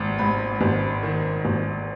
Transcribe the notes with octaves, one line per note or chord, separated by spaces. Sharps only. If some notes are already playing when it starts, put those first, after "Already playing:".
Already playing: G#1
G#2 B5
G#1
D#3
G#1